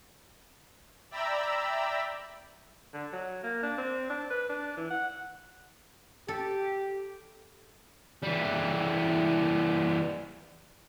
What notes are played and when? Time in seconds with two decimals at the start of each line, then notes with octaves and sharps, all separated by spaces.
1.11 D5 E5 G5 A#5 B5 E6
2.94 D3
3.13 F#3
3.43 A#3
3.63 D4
3.78 C4
4.10 D4
4.30 B4
4.49 D4
4.77 E3
4.90 F#5
6.28 G4 A4
8.23 E3 G3